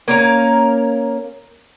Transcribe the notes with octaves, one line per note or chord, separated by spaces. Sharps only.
A#3 C#4 A#4 F5